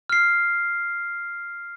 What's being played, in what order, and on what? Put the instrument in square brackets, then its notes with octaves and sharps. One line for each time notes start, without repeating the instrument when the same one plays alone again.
[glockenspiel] F6 C7